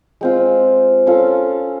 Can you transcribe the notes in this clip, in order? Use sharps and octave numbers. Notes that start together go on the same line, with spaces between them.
G#3 C4 F4
C#4 F4 A4